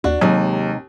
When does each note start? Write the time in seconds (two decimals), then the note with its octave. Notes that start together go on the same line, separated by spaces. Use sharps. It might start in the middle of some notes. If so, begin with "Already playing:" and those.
0.04 D#2 D4 F#4
0.21 D#2 C3 F#3 G#3 D#4